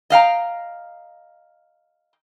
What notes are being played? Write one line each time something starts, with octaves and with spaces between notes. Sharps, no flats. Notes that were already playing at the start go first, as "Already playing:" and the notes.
D#5 F5 G5 A#5